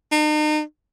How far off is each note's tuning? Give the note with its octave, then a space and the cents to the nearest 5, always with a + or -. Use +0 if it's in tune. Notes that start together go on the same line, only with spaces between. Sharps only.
D#4 -40